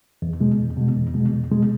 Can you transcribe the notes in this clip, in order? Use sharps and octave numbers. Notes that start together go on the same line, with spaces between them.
E2
B2 G#3
E2
B2 G#3
E2
B2 G#3
E2
B2 G#3